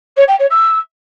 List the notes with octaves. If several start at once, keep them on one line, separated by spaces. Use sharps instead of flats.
C#5
G5
C#5
E6